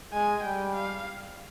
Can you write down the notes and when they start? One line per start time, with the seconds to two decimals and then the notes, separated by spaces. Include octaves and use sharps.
0.13 G#3 G#5
0.44 G3 G5
0.75 F5